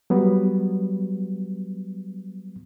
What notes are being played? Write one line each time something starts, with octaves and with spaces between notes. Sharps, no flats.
F#3 G3 B3